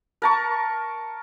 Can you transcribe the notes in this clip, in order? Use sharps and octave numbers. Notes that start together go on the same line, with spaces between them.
A#4 A5 C#6